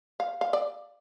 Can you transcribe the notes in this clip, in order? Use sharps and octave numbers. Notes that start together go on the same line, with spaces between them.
F5
F5
D5